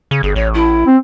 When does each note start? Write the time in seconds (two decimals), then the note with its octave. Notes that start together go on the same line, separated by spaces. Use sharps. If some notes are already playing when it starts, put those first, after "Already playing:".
0.11 C#3
0.23 G1 G#4
0.36 A1 C#5
0.54 E4
0.87 C4